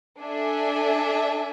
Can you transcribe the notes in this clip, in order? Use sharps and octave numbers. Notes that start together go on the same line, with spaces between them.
D4 A4 E5 G#5